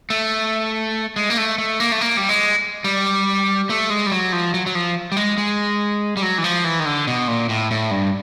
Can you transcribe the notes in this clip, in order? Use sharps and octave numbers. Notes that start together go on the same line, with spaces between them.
A3
G#3
A#3
A3
A3
A#3
A3
A#3
G3
G#3
G3
A3
G#3
G3
F#3
F3
F#3
F#3
F3
G3
G#3
G#3
G3
F#3
E3
F3
E3
D#3
D3
B2
A#2
A2
A2
G2